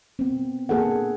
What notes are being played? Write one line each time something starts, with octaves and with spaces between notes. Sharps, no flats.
B3 C4
A#3 D4 G#4 A4 B4 F#5